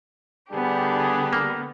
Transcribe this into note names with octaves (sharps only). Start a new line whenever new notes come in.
D3 G3 B3 D4 G4 G#4
A#3